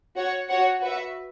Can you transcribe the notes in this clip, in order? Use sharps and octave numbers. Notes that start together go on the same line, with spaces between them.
F#4 C#5 F#5
F#4 C#5 F#5
F#4 B4 E5